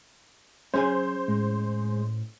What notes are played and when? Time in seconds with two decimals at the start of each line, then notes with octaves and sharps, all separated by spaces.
0.74 F#3 C#4 G#4 C5 G#5
1.28 A2 G#3